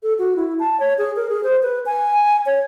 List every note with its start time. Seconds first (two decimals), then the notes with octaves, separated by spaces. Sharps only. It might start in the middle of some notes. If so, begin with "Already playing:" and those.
0.03 A4
0.19 F#4
0.36 E4
0.60 A5
0.80 C#5
0.98 G#4
1.16 A#4
1.29 G#4
1.44 C5
1.62 B4
1.86 G#5
2.46 C#5